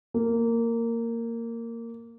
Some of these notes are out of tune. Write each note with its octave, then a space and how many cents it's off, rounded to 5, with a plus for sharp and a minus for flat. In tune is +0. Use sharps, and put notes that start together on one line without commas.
A#3 -15